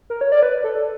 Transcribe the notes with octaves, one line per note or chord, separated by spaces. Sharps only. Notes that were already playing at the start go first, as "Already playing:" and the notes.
A#4
C#5
D5
B4
A4
A4